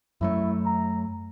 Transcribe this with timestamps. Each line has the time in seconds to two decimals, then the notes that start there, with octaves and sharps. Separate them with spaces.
0.21 F#2 F#3 A3 E4
0.66 A#5